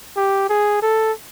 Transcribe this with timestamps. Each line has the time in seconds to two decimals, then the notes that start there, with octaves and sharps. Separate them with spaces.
0.17 G4
0.49 G#4
0.83 A4